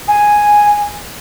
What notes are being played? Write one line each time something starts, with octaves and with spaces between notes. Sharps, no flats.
G#5